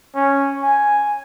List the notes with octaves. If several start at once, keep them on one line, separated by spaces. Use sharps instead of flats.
C#4
G#5